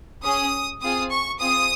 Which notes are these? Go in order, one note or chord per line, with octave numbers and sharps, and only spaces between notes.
C#4 G#4 D#6
C4 F4 G#4 D#6
C#6
C4 F4 G#4 D#6